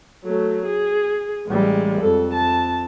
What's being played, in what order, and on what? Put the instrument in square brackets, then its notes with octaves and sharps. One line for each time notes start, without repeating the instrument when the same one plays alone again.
[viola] F#3 A3
G#4
[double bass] A1 G3 [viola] G#3
[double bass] F2 [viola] A4
[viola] A5